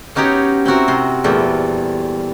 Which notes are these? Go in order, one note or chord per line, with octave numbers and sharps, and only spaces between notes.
B3 C#4 D#4 F#4 G4 C#5
C4 E4 F#4 A#4
C3 C6
E2 A#2 G3 A3